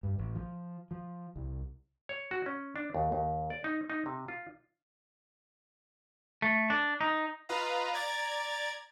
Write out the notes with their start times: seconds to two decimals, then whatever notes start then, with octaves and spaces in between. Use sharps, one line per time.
0.03 G2
0.19 A1
0.35 F3
0.91 F3
1.36 C2
2.09 C#5
2.31 F#4
2.46 C#4
2.76 D4
2.95 D#2
3.12 D#2
3.50 D5
3.64 D#4
3.90 D#4
4.06 C3
4.28 F4
6.42 A3
6.70 D4
7.01 D#4
7.49 F4 B4 D#5 F5 A#5
7.93 D5 A#5 G#6 A6